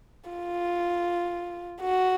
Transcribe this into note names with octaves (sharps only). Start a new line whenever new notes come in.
F4
F#4